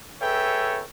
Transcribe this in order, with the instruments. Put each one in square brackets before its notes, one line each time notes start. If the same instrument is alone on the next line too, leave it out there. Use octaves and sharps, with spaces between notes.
[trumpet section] G#4 A4 B4 C#5 E5 G5